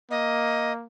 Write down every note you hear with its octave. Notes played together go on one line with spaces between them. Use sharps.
A#3 D#5